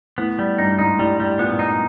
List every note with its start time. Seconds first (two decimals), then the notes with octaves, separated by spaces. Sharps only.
0.18 A2 B3
0.39 G3
0.58 G2 D#4
0.79 G#2 D#4
0.99 A2 G3
1.20 G3
1.39 A#2 B3
1.59 D#4